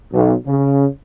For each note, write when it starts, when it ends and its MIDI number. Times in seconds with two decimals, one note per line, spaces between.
0.12 0.33 35
0.45 0.86 49